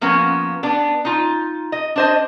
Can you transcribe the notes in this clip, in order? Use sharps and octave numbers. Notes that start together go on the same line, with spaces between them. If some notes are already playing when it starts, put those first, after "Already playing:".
F3 A#3 B3 C#4
B3 D4
D#4 F4
D#5
D4 C5 D#5